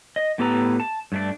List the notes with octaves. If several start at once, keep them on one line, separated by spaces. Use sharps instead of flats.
D#5
A2 B3 G4 A4 B4 A#5
A5
G2 A3 D4